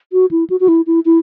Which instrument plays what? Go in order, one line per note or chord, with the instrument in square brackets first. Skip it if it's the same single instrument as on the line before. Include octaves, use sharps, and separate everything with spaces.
[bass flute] F#4
E4
F#4
F#4
E4
E4
E4